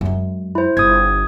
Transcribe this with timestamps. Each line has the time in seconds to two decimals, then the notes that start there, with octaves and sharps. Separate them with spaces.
0.01 F#2 G#3
0.55 E4 C5
0.77 G1 D#6 G#6